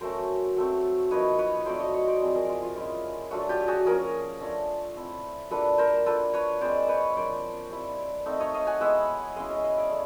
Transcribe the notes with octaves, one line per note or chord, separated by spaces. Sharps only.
F#3 A3 C#4 A#4 C5
F#3 A3 C4
F3 A#3 D#4 B4 C#5
B4 C#5
F#3 A3 C4 D#4 C5 D5
C#5 D#5
C#5 D#5
C5 D5
F3 G#3 C4 E4
G#4 A#4
F4
F4
G#3 C#4 E4
F#3 A3 D4 F4 F#4
F4 G4
G4
F#4 G#4
F3 A#3 C#4 G#4 A#4
A3 D4 F4
A3 C4 E4
G3 A#3 D4 F4 A4 B4
A#4 C5
A#3 D4 F4 A4 B4
B4 C#5
G#3 C4 F4 C5 D5
B4 C#5
F3 A#3 D4 C5 D5
G3 C4 E4
A3 C4 D#4
C#5 D#5
D#5 F5
F#5 G#5
G#3 B3 E4 E5 F#5
G#3 C#4 E4 D#5 F5
D#5 F5
E5
D#5 F5
D5 E5
A3